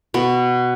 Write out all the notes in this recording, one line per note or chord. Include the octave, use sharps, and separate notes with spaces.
B2 B3